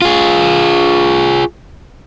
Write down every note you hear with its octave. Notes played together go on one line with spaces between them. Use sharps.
F4 G#4